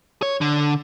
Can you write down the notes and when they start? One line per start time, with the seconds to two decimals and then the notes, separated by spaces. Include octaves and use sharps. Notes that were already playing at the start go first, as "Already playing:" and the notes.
0.22 C#5
0.41 D3